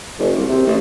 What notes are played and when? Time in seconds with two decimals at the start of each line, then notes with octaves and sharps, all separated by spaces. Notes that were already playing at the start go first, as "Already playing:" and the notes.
0.19 F#1
0.36 C2
0.48 C3
0.67 A1